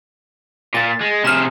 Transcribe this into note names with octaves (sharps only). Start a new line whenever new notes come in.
A#2 A6
G#3
C3 G#4 F6 E7